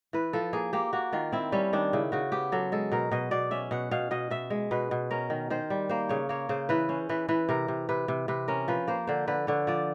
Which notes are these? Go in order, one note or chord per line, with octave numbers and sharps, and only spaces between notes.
E3 B4
F3 A4
A#3 G#4
A#3 G4
A#3 F#4
D#3 F4
C4 E4
G3 C#4
D#3 D4
C#3 E4
C#3 F#4
B3 G4
F#3 A4
G#3 A4
B2 A#4
B2 D#5
B2 D5
C#4 E5
B2 F#5
B2 F5
B2 D#5
B2 E5
G#3
B2 B4
B2
C#4 A#4
D#3
D#3 C5
G3
A#3 C5
C#3 C#5
A#3 C#5
C#3 C5
E3 B4
C#4 C5
E3 B4
E3 B4
C3 A#4
C3
C3 B4
C3
C3 B4
C#4 A#4
F3 B4
A#3 C5
D3 C5
D3 B4
D3 C#5
F3 D5